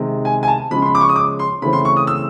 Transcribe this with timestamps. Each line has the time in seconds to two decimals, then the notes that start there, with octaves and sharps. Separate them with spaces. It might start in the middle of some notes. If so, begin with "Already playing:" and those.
Already playing: C3 D#3 G#3
0.25 G#5
0.43 G#5
0.48 A5
0.71 C#3 F3 G#3 C#4 B5
0.82 C6
0.86 B5
0.95 D6
1.01 C#6
1.09 D#6
1.16 D6
1.39 C6
1.62 C#3 E3 A3 C4 B5
1.73 C6
1.85 C#6
1.96 D#6
2.07 E6